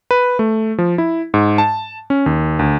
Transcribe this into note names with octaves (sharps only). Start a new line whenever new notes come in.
B4
A3
F3
E4
G#2
A5
C#4
D#2
D2